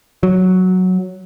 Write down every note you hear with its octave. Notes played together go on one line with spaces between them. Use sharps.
F#3